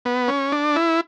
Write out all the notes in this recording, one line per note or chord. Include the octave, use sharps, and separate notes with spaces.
B3
C#4
D4
E4